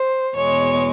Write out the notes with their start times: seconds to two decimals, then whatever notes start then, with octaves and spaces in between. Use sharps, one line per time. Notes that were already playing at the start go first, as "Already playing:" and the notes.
Already playing: C5
0.35 E2 B2 G#3 C#5